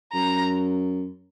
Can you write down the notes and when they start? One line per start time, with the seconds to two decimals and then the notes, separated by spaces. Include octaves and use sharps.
0.13 F#2 A#5